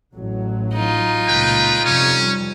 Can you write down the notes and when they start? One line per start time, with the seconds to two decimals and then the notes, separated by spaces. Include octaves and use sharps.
0.15 A1 F#3
0.75 D#4 F4
1.28 C#2 A#2 B4 G5
1.84 F2 C3 G3 C#4